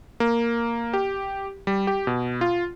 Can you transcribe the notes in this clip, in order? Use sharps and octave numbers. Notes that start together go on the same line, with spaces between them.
A#3
G4
G3
G4
B2
F4